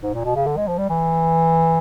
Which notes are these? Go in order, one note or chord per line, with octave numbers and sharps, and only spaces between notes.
G#2
A#2
B2
C#3
D3
G#3
F3
G3
E3